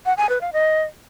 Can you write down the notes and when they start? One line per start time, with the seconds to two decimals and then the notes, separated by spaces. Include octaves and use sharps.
0.06 F#5
0.17 G#5
0.29 B4
0.41 F5
0.53 D#5